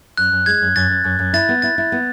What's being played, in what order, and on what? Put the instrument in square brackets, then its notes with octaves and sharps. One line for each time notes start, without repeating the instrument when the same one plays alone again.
[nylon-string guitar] F#2 [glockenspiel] F#6
[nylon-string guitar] F#2
[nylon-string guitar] G#3 [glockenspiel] G#6
[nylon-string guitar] F#2
[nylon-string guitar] F#2 [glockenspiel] A6
[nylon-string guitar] F#2
F#2
F#2
[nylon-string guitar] E4 [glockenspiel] A6
[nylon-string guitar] B3
[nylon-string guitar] E4 [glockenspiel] A6
[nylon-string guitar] E4
B3